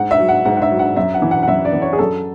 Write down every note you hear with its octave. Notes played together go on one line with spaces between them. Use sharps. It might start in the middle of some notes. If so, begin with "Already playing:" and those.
Already playing: G#2 F#5
E5
F#3
F#5
G#2 F#5
F#5
E5
F#3
F#5
F#2 E5
F#5
E3
F#5
F#5
F#2 E5
D5
E3
C#5
G#4
F#2 A4